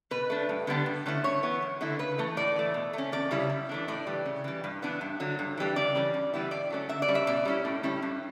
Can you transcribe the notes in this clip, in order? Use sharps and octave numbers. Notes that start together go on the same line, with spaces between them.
B2 B4
A3 D4
G2
D3 G3 B3 D4
G2
D3 A3 C#4 E4
G2 C#5
E3 B3
F#2
D3 A3 E4
C#3 B4
E3 A3
A2 D5
E3 A3
B2
A3 C#4
E2 D5
C#3 G3 C#4 E4
F#2
E3 A3 D4
A2 D5
E3 G3
C#3
E3 G3
G2
E3 B3 D4
G2
D3 F#3
G2
E3 G3 D4
C#3 D5
E3 G3 C#4
G2
E3 G3 B3 E4
G2 D5
F#3 A3 C#4
D3 E5
D5
G3 C#4
E5
B2 D5
G3 C#4 E4
A2
G3 C#4 E4
G2